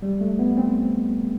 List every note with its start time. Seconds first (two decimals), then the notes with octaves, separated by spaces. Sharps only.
0.02 G3
0.21 A3
0.39 B3
0.57 C4